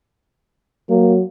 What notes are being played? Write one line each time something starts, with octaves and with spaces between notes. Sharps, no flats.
F#3 A#3